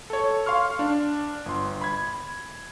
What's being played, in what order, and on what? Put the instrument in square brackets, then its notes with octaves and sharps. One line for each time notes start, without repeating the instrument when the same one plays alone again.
[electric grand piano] A4 C#5
F5 C6 C#6 F6
D4
G1 C6
B5 G#6